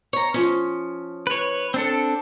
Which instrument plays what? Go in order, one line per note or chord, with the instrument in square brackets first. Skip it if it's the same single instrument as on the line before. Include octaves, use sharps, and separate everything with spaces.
[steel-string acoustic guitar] C#5 A#5
F3 C#4
[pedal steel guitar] B4 C#5
C4 D4 A4